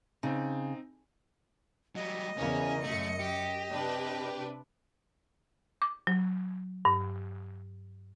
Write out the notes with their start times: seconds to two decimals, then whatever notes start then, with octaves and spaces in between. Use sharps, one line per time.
0.23 C#3 C4 D#4
1.95 F#3 G3 D#5
2.37 E2 C#3 A#3 C#4
2.84 F#2 A3 C#7
3.20 G4
3.71 C3 D4 B4
5.82 D6
6.07 F#3
6.85 G2